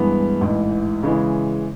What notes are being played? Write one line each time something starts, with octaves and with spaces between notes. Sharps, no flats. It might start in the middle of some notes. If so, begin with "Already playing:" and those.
Already playing: G2 E3 G#3 B3
A1 G#2 E3
C#3 E3 G#3